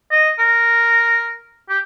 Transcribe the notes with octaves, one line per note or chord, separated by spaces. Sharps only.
D#5
A#4
G4